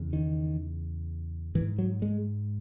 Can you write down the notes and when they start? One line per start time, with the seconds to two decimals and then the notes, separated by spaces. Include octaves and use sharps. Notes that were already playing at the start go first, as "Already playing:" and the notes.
Already playing: E2 C#3
0.13 D#3
1.55 G#2 E3
1.78 F#3
2.02 G#3